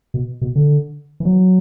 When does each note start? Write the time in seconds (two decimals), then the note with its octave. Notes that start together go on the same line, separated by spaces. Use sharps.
0.14 B2
0.42 B2
0.56 D3
1.20 E3
1.25 F#3